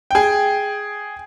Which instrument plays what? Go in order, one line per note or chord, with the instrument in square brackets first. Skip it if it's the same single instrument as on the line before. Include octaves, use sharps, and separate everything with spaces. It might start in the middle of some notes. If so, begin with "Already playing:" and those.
[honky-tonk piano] G#4 G5